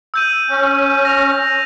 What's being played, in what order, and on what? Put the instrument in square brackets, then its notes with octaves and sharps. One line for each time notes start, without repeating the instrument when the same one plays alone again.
[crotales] E6 G6 D#7
[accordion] C#4
[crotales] A#6 F7